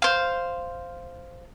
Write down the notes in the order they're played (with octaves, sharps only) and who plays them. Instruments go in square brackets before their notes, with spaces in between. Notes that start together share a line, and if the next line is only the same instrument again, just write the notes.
[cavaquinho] C5 F5